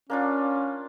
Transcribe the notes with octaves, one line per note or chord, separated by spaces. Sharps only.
A#3 C#4 D4 F4